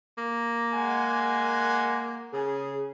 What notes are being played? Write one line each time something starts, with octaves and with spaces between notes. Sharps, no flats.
A#3
G#3 F#5 G#5
C#3 G#4